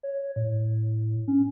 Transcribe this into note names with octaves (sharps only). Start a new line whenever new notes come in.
C#5
A2
C#4